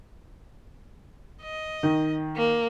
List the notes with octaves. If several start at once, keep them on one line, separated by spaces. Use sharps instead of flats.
D#5
D#3
A#3